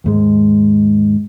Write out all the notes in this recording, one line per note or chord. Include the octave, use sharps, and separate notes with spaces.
D#2 G#2 G#3